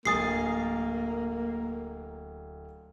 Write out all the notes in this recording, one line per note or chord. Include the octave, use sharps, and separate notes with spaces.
D1 A#3 G#5 D#6 A6 C7